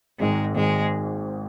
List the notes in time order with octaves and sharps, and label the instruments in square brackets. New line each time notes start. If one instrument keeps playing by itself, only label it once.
[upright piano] G#1 G#2 D#3 [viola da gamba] G#3
[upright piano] G#1 G#2 D#3 [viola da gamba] G#3